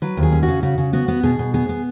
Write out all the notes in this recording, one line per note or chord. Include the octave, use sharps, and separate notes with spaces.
F#3 B4
D#2
G#4
C#4
F#4
C#3
C#3 F#4
C#3
B3 F#4
B3
B2 G#4
B2
B3 G#4
B3